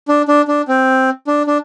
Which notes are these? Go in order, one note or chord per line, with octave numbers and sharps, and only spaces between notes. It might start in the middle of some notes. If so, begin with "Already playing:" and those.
D4
D4
D4
C4
D4
D4